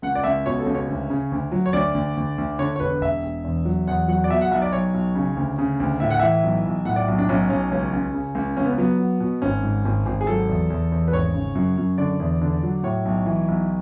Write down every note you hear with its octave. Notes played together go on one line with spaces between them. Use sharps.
C#2 F#5
D5
C#2 E5
B2 C#5
A4
C#2
C#5
D2
C#3
D2
F#3
C#5
D2 D5
D2
D2
D2
D3 C#5
C#5
E1 B4
E1 E5
E1
E2
F#3
E2 F#5
F#3 F#5
D5
B2 E5
F#5
B1 E5
D5
B1 C#5
B1
C#3
D2
C#3
D2
A2 E5
F#5
E3 E5
B1
B1
A2 F#5
D5
B1
D4
B1 C#4
B1 C#4
C#2 C#4
C#2
C#3
C#2
C#2 C#4
B3
F#3 B3
F#3
B2
G#1 C#4
G#2
G#1
G#1
G#4
F#3 A4
E2
E2
E2
B4
G#1 C#5
C#3
F#2
F#2
D3 D5
E2
D3
F#3
A2 C#5
B1
E3
B1